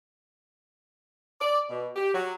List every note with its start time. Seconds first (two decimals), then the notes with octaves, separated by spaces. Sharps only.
1.41 D5
1.70 B2
1.96 G4
2.14 F#3